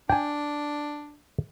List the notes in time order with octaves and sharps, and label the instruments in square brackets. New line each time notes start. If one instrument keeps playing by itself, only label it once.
[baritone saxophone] D4 [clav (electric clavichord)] G5 G#5